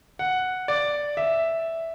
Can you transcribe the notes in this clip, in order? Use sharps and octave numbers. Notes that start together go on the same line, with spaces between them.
F#5
D5
E5